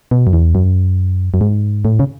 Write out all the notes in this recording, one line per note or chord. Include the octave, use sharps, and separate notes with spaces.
B2
F#2
E2
F#2
F#2
G#2
A2
C#3